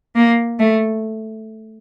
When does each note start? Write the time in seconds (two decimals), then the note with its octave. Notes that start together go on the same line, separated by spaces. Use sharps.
0.15 A#3
0.59 A3